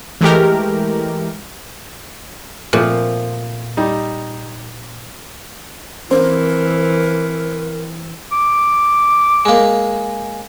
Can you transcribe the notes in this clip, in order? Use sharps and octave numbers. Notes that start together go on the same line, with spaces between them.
E3 G#3 A3 G4 A#4
A#2 F3 A3 C4
G3 D#4
E3 C4 A#4 C5
D6
G#3 A#3